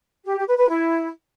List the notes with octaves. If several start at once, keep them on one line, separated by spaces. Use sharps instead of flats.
G4
G4
B4
B4
E4